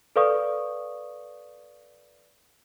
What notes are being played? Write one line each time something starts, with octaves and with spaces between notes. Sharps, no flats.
A4 B4 D5 F5 C#6 D#6